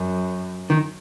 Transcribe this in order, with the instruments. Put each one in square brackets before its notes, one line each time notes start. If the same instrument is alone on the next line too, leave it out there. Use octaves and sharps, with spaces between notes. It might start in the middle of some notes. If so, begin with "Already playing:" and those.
Already playing: [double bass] F#2
[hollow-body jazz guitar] D#3